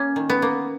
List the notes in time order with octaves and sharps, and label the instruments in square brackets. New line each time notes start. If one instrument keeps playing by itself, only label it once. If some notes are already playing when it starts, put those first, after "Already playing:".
Already playing: [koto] A#3 C#4
D#3
B3
A#3